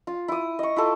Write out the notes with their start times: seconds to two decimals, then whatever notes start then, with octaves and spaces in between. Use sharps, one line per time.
0.07 F4
0.28 E4 D#6
0.59 D#5 C#6
0.76 E4 F4 A4